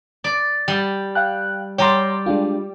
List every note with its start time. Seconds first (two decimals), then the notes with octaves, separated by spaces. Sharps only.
0.24 D5
0.68 G3
1.15 F5 G5 F#6
1.78 G3 G4 C#5 A#5 C6
2.26 G#3 D4 F4